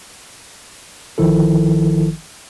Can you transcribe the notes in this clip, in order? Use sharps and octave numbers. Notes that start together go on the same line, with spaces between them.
G1 D#3 F3 E4 A4